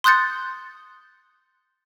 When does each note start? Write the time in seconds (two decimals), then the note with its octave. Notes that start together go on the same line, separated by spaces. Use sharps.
0.04 C6 D#6 F#6 G6 A6 C#7